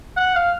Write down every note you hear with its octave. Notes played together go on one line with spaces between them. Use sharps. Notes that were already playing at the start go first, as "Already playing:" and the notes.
F#5
F5